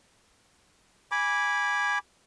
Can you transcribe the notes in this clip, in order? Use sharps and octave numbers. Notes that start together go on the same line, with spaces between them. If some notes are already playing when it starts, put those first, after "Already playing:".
G#5 B5 D6